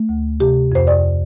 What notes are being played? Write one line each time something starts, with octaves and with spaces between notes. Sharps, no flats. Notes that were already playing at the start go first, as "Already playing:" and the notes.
Already playing: A3
D2
C3 G4
F2 C5
D5